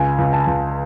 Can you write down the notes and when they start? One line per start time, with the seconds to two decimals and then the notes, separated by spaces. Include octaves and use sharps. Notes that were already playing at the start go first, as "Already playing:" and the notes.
Already playing: C#2 G#5
0.18 C#2
0.33 A5
0.47 C#2